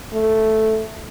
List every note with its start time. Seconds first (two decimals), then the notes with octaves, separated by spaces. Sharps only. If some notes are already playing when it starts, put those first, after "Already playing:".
0.14 A3